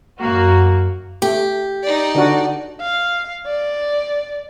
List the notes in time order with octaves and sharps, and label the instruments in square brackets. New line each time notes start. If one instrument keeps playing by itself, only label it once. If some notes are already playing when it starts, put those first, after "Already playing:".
[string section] F#2 A#3 F#4
[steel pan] A3 [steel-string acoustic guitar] G4
[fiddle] D#4 D5
[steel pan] D3 D4 F#4
[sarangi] F5
D5